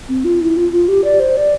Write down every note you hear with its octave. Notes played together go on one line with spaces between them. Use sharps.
C4
F4
E4
F4
F4
G4
D5
C5
D5